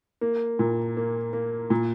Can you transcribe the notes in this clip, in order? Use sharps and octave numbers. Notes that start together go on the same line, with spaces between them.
A#3
A#2
A#3
A#3
A#2